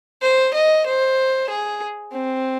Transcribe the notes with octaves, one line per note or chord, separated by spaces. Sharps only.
C5
D#5
C5
G#4
C4